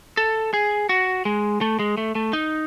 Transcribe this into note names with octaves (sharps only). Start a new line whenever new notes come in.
A4
G#4
F#4
G#3
A3
G#3
A3
A3
D#4